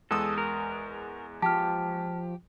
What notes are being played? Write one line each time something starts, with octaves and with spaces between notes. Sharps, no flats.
E2 G#3 A4 D#6
A#4
F3 G4 A5 F6